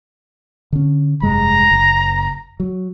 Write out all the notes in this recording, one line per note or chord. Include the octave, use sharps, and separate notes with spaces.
D3 C#4
F1 G2 G#3 A#5
F#1
F#3